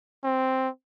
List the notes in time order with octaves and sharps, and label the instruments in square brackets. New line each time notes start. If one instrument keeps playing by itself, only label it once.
[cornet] C4